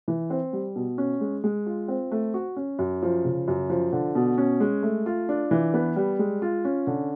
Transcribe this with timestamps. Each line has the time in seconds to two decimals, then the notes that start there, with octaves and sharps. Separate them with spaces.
0.08 E3
0.30 C4
0.53 G3
0.76 B2
0.98 C#4
1.21 G#3
1.44 G#3
1.66 F4
1.88 C4
2.11 A3
2.34 F#4
2.57 C#4
2.79 F#2
3.03 F3
3.25 C#3
3.48 F#2
3.70 F3
3.93 D3
4.15 B2
4.38 C#4
4.60 G#3
4.83 A3
5.06 F4
5.29 D4
5.51 E3
5.74 B3
5.96 G3
6.19 G#3
6.42 F4
6.65 C#4
6.87 D3